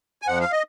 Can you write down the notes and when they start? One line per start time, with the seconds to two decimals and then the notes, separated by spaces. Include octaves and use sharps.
0.22 G#5
0.27 F2 F3 F#5
0.41 F5
0.52 D#5